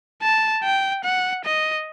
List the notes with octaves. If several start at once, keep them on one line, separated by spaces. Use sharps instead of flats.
A5
G5
F#5
D#5